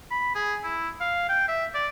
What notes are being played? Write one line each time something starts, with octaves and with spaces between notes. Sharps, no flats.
B5
G#4
E4
F5
G5
E5
D5